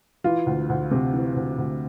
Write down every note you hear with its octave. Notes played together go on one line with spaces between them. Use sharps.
E3 F4
D2
D2
C3
E3
D2
D2